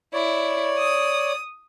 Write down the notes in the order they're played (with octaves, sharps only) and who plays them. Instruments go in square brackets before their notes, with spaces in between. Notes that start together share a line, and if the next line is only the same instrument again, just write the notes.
[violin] E4 [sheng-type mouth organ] C#5 D5
[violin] D#6